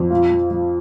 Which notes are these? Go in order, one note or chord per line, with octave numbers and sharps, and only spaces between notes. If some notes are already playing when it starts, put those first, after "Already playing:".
Already playing: F2
F3 F4
F3
F3